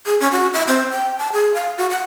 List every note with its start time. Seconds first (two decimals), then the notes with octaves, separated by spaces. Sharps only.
0.06 G#4
0.20 C#4
0.32 F#4
0.54 E5
0.68 C4
0.91 G5
1.18 A5
1.33 G#4
1.54 F5
1.78 F#4
1.90 F#5